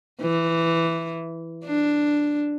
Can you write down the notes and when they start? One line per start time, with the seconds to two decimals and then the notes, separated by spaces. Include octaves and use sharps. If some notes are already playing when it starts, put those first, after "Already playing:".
0.21 E3
1.65 D4